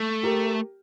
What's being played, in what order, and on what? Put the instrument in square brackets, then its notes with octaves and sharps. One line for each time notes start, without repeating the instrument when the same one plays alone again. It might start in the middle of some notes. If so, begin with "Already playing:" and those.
Already playing: [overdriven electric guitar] A3
[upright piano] G4 A#4